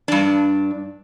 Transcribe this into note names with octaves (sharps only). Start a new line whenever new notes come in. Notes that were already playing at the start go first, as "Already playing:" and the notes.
G2 D4